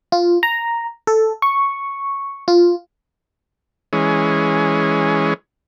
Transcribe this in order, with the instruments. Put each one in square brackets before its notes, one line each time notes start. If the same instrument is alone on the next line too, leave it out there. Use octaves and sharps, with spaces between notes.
[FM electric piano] F4
A#5
A4
C#6
F4
[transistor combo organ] E3 G#3 C#4